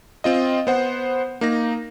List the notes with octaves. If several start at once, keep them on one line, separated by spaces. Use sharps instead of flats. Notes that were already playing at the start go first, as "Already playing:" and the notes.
C4 F4 D#5
B3 C5 F#5
A#3 D#4 A#6